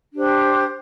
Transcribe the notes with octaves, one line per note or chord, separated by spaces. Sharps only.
D4 G4 C5